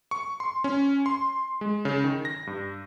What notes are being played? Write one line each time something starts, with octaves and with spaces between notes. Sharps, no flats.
C#6
C6
C#4
C6
G#3
C#3
D#3
A#6
G2